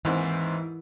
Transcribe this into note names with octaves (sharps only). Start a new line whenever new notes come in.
D#2 G#2 E3 C4